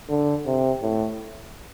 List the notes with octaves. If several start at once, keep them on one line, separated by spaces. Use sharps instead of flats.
D3
C3
A2